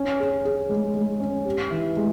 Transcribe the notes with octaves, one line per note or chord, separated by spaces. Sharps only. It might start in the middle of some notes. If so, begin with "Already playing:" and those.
Already playing: C#4
G#4
G#4
G#3
G#3
C#4
G4
E3
G#3